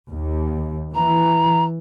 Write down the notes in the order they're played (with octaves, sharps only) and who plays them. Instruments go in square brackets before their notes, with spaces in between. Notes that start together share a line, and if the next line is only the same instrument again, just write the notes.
[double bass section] D#2
[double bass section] E3 [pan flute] A#5